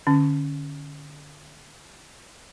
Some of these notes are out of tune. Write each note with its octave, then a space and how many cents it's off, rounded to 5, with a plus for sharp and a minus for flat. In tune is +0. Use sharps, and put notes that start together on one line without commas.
D3 +15 C#4 +0